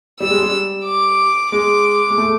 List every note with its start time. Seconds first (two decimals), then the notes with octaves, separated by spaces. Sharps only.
0.20 G3 E6
0.31 G#3
0.41 G3
0.86 D6
1.52 G#3 D6
2.10 G#3
2.18 A3